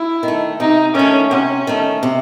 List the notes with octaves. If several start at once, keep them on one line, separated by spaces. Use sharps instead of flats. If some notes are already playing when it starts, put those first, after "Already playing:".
Already playing: E4
D#3
A3
C3 D#4
D#3 A3 C#4
C3 C#4
D#3 A3
C3